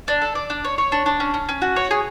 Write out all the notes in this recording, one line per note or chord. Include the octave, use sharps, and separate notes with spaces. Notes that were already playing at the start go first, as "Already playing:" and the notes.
D4
A4
D5
D4
C#5
C#5
D4
D4
C#4
C#4
C#4
F#4
C#5
G#4